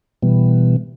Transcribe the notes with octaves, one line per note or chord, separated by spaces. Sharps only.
B2 E3 G3 B3